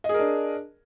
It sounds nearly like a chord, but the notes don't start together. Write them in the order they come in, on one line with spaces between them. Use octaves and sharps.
D#5 G#4 A#4 D4